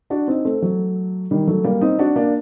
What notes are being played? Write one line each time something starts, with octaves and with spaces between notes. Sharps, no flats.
D4 F#4
C4 D#4
A3 C4
F#3 A3
D#3 G3
F#3 A3
G3 A#3
C4 D#4
D4 F#4
A#3 D4